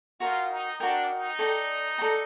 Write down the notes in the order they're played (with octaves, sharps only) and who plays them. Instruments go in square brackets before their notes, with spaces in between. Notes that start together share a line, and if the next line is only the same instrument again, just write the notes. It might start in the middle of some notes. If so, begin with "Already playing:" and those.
[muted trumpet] F4 [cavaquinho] F#4 A#4 D#5 G5
[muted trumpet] D#4
[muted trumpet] D4 [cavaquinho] F#4 A#4 D#5 G5
[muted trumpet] D#4
[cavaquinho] A4 D5 G5 A#5
A4 D5 G5 A#5